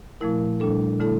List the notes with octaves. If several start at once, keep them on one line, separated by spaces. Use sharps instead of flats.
A#2 F3 A3 E4 A#4
A#2 G3 D4 A4
D3 A3 E4 A4